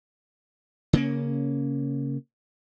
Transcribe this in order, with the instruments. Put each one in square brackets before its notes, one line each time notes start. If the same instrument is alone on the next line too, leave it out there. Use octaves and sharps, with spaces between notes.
[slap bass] C#3 A#3 C#4